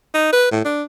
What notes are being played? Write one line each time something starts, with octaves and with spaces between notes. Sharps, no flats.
D#4
B4
A2
D4